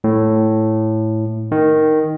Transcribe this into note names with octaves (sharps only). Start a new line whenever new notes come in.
A2
D#3